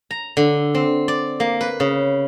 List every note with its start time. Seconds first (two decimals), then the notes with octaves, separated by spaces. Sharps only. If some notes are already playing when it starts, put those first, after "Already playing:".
0.11 A#5
0.37 D3
0.75 C4
1.08 D5
1.40 A#3
1.61 B4
1.80 C#3